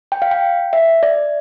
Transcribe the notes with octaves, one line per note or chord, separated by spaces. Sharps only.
G5
F5
G5
E5
D5